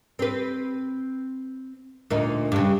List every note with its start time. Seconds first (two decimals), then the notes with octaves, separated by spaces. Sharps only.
0.19 C4 B4
2.10 D2 A#2 D#4
2.52 G2 C#3